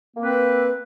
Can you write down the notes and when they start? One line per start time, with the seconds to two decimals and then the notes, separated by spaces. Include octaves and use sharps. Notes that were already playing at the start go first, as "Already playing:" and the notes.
0.17 A#3
0.21 C4
0.24 B4